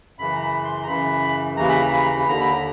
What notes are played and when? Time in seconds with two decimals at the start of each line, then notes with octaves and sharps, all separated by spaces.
0.18 F#2 C#3 E3 B5
0.35 A#5
0.42 B5
0.64 C6
0.83 A#5
0.87 F#2 C#3 E3 B5
1.57 D#2 C#3 E3 A#5
1.69 B5
1.80 A#5
1.93 B5
2.05 A#5
2.17 B5
2.26 D#2 D3 A#5
2.41 B5
2.52 A#5